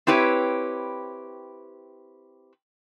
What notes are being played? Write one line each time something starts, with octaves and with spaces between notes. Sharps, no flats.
C4 E4 G4 B4 C#5